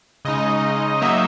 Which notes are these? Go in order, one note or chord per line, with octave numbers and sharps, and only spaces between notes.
C#3 G#3 D#4 D#5
F#3 A#3 D#4 E5